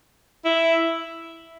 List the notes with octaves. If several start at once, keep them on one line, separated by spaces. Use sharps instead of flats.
E4